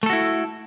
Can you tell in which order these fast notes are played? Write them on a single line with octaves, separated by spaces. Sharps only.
A3 A4 F#4 E4